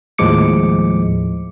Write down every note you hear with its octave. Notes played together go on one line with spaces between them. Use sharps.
D#2 A2 F3 G#3 D6 C#7